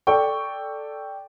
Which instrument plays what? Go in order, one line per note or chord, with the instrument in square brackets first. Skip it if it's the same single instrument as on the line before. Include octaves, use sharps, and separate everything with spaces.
[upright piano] A4 D5 G5 C#6